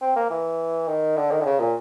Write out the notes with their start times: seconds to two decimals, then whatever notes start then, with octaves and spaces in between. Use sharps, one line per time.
0.01 C4
0.16 A#3
0.30 E3
0.88 D#3
1.17 D3
1.31 D#3
1.41 D3
1.45 C#3
1.60 A#2